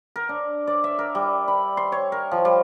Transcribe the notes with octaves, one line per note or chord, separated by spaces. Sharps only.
A#4
D4
D5
E5
A#4
G3
B5
C6
C#5
A#4
F3
G3